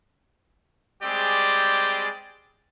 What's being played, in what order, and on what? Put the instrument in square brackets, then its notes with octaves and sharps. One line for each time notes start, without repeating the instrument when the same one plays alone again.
[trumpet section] G3 G#3 C4 G4 G#4 D5